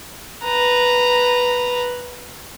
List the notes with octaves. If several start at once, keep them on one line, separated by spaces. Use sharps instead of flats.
B4 A#5